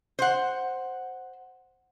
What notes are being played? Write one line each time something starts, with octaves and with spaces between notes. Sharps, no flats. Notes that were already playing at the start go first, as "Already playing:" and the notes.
C5 F#5